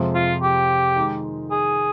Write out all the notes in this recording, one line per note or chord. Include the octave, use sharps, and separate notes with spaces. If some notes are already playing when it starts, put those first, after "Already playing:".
Already playing: F2 C3 F3 G#3
F4
G4
D#3 G#3 D#4
G#4